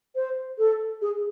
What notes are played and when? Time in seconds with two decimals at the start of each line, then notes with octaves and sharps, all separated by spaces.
0.15 C5
0.58 A4
1.02 G#4